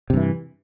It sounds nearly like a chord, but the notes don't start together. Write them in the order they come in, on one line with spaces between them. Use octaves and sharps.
C3 G2 E3